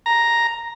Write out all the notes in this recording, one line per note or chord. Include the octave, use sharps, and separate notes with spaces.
A#5